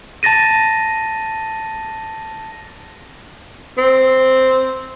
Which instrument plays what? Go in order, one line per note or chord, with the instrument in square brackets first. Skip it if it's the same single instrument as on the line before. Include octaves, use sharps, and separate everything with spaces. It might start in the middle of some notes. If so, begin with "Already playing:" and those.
[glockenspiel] A5 A6 A#6 D#7
[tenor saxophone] C4